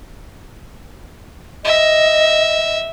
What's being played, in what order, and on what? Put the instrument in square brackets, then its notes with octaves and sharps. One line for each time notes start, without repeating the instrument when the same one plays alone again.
[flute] D#5 [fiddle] E5